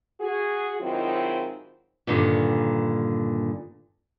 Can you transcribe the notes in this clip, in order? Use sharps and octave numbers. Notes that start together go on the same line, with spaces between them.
F#4 G#4
G#2 D#3 F#3 C4 E4 F4
G2 A#2 D3 D#3